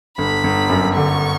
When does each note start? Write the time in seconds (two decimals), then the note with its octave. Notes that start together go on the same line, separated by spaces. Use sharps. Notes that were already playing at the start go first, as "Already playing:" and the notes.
0.18 G1 B5
0.44 G1
0.70 F#2
0.96 D3 C#6